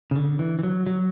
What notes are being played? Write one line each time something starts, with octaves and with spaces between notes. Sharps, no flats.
C#3
D3
E3
E3
F#3
F#3